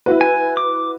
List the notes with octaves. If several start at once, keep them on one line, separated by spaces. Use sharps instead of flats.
E4 F#4 B4
G#5
D6